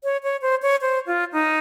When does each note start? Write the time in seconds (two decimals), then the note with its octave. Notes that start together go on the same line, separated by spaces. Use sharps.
0.04 C#5
0.23 C#5
0.42 C5
0.62 C#5
0.81 C5
1.06 F4
1.32 D#4